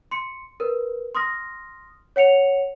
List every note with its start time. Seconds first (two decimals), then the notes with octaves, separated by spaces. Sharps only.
0.11 C6 C#7
0.60 A#4 B4
1.15 C6 D#6 F6 A#6
2.16 C#5 F#5 C#7 F7